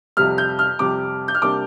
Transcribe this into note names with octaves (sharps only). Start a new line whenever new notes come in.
F2 C3 G3 F6
G6
F6
F2 C3 G3 D6
G6
F6
C3 G3 A#3 D4 D6